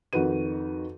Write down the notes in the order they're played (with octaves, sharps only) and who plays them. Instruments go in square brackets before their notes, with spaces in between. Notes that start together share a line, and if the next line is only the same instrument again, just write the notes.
[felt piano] F2 D#3 D#4 F#4 B4 D#7